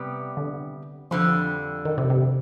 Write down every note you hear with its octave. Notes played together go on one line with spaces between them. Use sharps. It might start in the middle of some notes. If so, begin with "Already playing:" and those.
Already playing: C3 G3 B3 G4
D3
F2 D3 F3 G3
D#3
C3
C3